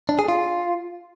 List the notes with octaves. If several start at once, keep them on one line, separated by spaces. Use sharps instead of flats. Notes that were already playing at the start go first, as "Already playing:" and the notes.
D4
G#4
F4